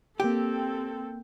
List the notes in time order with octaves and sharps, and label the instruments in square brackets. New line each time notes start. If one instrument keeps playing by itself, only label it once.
[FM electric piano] A#3 G5 [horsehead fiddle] C4 A4 [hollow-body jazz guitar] G4